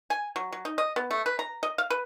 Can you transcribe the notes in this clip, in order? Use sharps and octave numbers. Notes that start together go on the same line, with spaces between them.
G#5
F#3
F#3
D#4
D#5
B3
A3
B4
A#5
D#5
F5
B4